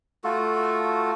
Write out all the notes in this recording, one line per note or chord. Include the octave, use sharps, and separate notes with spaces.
A3 F4 F#4 A4